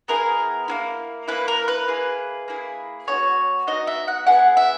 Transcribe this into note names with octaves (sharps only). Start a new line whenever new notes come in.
B3 E4 G#4 A#4
A#3 C#4 E4
A#3 C#4 E4 B4
A#4
B4
A#3 E4 G#4
A#3 E4 G#4
B3 D#4 F#4 C#5
B3 D#4 F#4 D#5
E5
F#5
B3 E4 G#4 F#5
E5